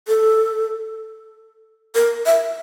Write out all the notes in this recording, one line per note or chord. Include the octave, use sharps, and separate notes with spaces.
A4
A#4
E5